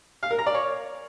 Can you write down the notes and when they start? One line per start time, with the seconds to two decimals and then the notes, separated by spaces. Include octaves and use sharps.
0.23 F5
0.31 A#4
0.39 A#5
0.47 D5
0.54 C#5